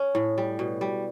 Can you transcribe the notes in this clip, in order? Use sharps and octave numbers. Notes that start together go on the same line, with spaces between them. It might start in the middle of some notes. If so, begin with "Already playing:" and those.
Already playing: C#4
A2
G3
B2
G3